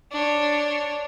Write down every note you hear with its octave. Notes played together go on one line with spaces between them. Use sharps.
D4 C#5